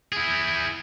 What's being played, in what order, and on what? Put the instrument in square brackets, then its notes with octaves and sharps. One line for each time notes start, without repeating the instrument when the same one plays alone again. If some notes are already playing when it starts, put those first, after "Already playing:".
[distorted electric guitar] E4 G#4